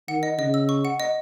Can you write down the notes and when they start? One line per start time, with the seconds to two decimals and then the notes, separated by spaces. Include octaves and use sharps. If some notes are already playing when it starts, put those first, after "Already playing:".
0.08 D#3 F#5
0.23 D#5
0.38 C#3 D#5
0.54 E6
0.69 C#6
0.85 F#5
1.00 D#5